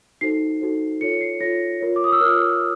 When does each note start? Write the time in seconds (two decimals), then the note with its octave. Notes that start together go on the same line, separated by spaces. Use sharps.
0.21 D#4 F#4 A4 C5 C7
0.61 D#4 F#4 A4 C5
1.01 F4 A4 C#5 C#7
1.21 C7
1.40 F4 A4 C#5 A#6
1.81 F4 A#4 C#5
1.96 D6
2.04 D#6
2.12 E6
2.20 F4 A#4 C#5 F6